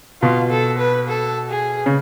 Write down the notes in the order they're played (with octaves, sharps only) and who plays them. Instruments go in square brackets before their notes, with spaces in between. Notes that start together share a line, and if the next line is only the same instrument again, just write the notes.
[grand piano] B2 [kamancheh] F4
[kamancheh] A4
B4
A4
G#4
[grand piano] C#3